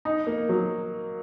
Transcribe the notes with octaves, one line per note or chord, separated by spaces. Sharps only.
D#4
A#3
F#3